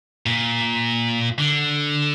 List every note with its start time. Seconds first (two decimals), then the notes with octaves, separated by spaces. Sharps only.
0.26 A#2
1.39 D3